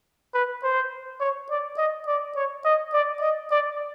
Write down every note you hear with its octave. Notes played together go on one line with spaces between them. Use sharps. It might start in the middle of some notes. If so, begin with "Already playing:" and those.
B4
C5
C#5
D5
D#5
D5
C#5
D#5
D5
D#5
D5